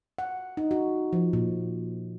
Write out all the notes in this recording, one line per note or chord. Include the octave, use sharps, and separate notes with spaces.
F#5
D#4
F#4
F3
A#2